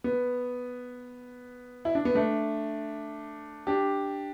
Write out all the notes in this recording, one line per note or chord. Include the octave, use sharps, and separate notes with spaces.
B3
E4
D4
B3
A3 D4
D4 G4